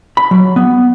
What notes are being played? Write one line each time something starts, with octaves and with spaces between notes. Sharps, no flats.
B5
F#3
B3